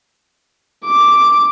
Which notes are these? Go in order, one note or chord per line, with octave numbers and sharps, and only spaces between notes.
D6